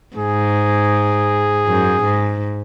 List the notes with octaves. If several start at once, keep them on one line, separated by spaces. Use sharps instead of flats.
G#2 G#4
F#2
G#2